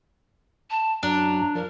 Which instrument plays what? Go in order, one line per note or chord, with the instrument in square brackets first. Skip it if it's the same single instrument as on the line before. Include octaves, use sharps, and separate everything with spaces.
[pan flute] A5
[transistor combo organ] F#2 [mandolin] D4 [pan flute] A#5
[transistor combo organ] F3 [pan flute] A#4